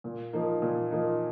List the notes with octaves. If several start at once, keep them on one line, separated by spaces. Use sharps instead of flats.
A#2
F3 A#3 D#4
A#2
F3 A#3 D#4